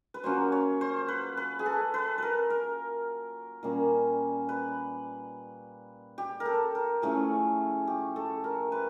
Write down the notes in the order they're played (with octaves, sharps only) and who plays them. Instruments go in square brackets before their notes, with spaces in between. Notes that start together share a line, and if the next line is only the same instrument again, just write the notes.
[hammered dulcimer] B4
F#3 A#3 C#4 F4 C5
C#5
C5
B4
B4
G#4
A4
B4
A#4 B4
A#4
A#2 G3 A#3 C#4
B4
G4
A#4
A4
A#4
A2 F3 A3 C#4 G#4
G4
A4
A#4
B4